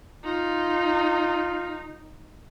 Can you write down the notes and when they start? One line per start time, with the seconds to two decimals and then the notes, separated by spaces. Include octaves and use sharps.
0.24 D#4 F4